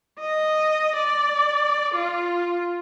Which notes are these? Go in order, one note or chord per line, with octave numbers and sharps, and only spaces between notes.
D#5
D5
F4